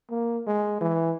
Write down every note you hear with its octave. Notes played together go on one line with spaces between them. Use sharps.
A#3
G#3
E3